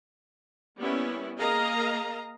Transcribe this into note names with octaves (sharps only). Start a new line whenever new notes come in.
G3 A#3 B3 C#4 E4
A#3 G#4 A#4 D#5 F5 A#5